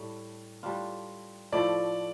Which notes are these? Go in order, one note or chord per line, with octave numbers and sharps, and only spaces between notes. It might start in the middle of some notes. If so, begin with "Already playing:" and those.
Already playing: A2 G3 D4
A2 G3 D4 F4
A2 F3 A3 D5